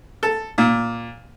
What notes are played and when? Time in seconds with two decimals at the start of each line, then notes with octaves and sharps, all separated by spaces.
0.23 A4
0.58 A#2